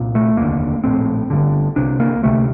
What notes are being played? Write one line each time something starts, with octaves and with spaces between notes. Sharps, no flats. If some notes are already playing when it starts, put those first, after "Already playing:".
Already playing: C2 A#2
A3
F1 D#2 D3 A#3
A#1 A2 C4
G1 G2 D3
C2 C3 D4
A#3
D2 C3 A3